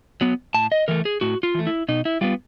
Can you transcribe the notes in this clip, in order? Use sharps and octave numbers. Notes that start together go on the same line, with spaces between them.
F#3 B3
A2 A5
D#5
E3 A3 A#4
G#4
A2 F#4
F4
E3 A3
E4
B2 D#4
E4
G3 B3 F4